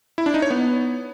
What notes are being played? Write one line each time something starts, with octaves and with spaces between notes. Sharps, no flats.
E4
D4
D#4
C#5
B3